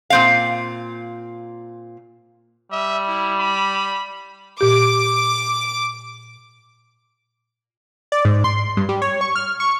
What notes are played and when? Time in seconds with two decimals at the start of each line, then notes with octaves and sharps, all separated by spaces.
0.10 A#2 C4 F5
2.72 G3 E5
3.08 E4
3.39 B5
4.61 A#2 G4 D6
8.12 D5
8.25 G#2
8.44 C6
8.77 G2
8.89 G3
9.02 C#5
9.21 C#6
9.36 F6
9.60 C#6